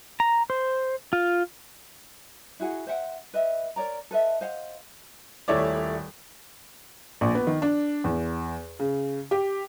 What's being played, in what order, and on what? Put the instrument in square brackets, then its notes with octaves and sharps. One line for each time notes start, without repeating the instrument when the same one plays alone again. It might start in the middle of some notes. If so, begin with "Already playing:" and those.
[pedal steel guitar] A#5
C5
F4
[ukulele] E4 F#4 G#4 F#5
C5 E5 F#5 G5
B4 D#5 E5
A#4 C#5 D5 A#5
A4 B4 D#5 E5
C5 D#5 F5 F#5
[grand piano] D#1 A3 E4 C#5 D5
[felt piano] A#1
B3
D#3
D4
E2
C#3
G4